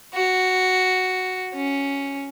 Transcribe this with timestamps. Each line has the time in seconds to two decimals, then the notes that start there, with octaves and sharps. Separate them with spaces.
0.14 F#4
1.54 C#4